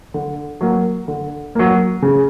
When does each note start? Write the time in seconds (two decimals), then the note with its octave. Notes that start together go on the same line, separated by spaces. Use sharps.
0.14 D3
0.61 F#3 A#3
1.08 D3
1.55 F#3 A#3
2.02 C#3